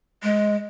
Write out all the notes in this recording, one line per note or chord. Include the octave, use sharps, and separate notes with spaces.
G#3